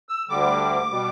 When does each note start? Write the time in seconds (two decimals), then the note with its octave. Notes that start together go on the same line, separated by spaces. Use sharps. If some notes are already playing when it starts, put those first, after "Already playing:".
0.09 E6
0.29 D2 D3 G3 D6
0.91 B2 G3